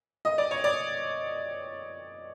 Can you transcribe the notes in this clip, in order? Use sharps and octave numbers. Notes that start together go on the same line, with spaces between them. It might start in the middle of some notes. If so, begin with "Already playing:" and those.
D#5
D5
C#5
D5